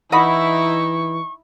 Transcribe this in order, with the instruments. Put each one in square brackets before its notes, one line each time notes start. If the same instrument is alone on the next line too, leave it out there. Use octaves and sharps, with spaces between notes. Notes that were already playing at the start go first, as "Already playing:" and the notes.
[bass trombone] E3 [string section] D#4 E4 [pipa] D#5 F#5 B5 [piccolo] C#6